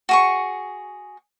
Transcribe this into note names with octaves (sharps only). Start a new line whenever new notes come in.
F#4 G#4 C#6